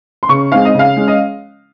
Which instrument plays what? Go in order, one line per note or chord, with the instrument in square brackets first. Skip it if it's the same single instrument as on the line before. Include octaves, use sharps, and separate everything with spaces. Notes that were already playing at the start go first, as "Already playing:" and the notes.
[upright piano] C6
C#3 C#6
G#3 C4 D#4 F5
D#5
C#3 F5
G#3 C#4
D#5